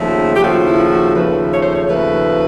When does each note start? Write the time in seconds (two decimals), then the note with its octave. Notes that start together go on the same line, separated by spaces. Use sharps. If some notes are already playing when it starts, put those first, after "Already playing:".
Already playing: D#2 C#3 F3 A3
0.36 G4
0.43 D#2 C#3 F3 A3 F#4
0.67 E4
0.91 F#4
1.15 D#2 C#3 F3 A3 B4
1.52 C#5
1.63 C5
1.74 C#5
1.88 D#2 C#3 F3 A3 B4